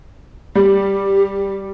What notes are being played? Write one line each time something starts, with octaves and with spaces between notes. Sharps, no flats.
G3 G4